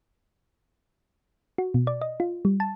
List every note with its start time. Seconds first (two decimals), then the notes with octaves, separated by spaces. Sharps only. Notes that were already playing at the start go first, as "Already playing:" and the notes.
1.58 F#4
1.74 B2
1.87 D5
2.01 D#5
2.20 F4
2.45 G3
2.60 A5